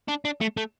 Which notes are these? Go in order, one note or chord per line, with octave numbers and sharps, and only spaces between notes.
D4
D4
A3
A3